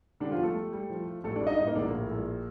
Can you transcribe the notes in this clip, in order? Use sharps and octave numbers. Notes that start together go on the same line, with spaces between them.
D3 G3 D4
F3 F4
G1
A3 A4
G3
G3
F3
F3
A1 A3 A4
D4 D5
G2
D#4 D#5
A2 D#4 D#5
A#3 A#4
A#1 D3 D4
A#3
A2
A#1